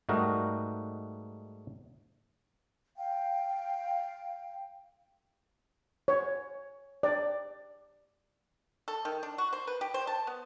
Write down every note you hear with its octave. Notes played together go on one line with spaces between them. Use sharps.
G#2 G3 A3 D#4 F#4 A#4
F5 G5
C#5
D5
A4
D#3
D4
F#4
C5
B4
G4
C5
A5
B3